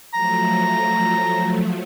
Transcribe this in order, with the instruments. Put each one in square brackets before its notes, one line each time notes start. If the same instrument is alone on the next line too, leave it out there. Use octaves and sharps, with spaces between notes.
[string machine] F3 F#3 A3 [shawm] A#5